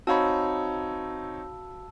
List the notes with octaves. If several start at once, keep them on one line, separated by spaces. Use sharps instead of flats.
C4 D#4 F#4 C#5 F5 A5 B5 E6